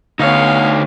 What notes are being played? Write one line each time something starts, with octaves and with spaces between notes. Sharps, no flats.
D2 B3 D#4 C#5 F5